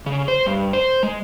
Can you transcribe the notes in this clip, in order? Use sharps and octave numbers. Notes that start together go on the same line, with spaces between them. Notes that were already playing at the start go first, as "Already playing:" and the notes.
C#3
C5
G2
C5
G#3